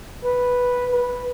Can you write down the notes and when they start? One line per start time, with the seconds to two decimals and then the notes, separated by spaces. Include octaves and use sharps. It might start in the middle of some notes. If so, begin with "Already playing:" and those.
0.24 B4
0.92 B4